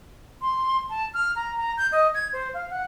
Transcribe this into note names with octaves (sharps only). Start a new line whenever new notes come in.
C6
A5
F6
A#5
A#5
G6
D#5
G#6
C5
F5
F#5